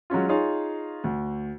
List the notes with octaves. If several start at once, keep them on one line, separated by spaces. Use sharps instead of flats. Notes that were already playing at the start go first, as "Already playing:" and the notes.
F#3 G#3 C#4 F4
D#4 F4 G#4 C#5 F5
D2